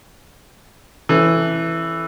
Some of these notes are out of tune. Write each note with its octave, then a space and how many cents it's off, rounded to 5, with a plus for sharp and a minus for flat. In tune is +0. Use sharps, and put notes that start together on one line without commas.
E3 +0 C#4 -45 A4 +0